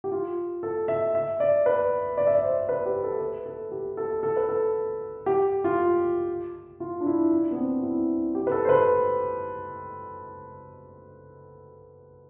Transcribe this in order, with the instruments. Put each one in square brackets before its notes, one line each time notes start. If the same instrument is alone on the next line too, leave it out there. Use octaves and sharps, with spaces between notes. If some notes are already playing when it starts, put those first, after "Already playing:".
[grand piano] G4
F4
A4
E5
E5
D5
B4
D5
E5
D5
C5
B4
G4
A4
B4
A4
G4
A4
A4
B4
A4
G4
F4
F4
D4
E4
D4
B3
C4
E4
G4
B4
A4
C5
B4